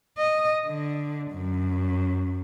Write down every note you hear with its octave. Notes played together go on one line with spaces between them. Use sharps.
D#5
D3
F#2